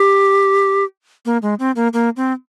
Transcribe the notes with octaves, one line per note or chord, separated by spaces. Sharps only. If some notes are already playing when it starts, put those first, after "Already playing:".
Already playing: G4
A#3
G#3
C4
A#3
A#3
C4